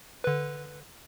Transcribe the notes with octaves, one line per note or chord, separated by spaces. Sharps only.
D3 B4